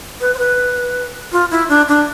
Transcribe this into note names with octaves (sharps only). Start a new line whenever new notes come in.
B4
C5
B4
F4
E4
D4
D4